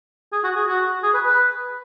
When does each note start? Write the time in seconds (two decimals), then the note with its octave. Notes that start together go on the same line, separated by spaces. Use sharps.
0.33 G#4
0.44 F#4
0.56 G#4
0.68 F#4
1.03 G#4
1.14 B4
1.26 B4